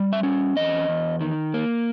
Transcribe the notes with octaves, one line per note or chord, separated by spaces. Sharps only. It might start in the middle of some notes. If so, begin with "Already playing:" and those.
Already playing: G3
E5
C#4
E2 D#5
E2
D#3
A#3